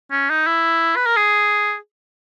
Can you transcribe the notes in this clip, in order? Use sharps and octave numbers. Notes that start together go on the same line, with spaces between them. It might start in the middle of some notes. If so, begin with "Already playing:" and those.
C#4
D#4
E4
B4
A#4
G#4